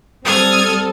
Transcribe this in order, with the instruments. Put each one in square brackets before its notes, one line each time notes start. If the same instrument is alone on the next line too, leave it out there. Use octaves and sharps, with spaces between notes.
[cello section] G3 C4 A4 [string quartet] D#6 F6 G#6